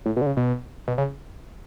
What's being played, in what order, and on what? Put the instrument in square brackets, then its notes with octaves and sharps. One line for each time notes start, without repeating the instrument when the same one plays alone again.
[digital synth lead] A2
B2
D3
C#3
B2
B2
C#3